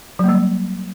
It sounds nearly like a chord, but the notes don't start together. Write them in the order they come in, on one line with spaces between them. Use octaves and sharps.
F#3 A#3 G3